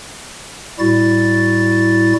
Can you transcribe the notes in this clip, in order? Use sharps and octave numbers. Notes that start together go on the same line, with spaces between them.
A2 G3 E4 F#4 A6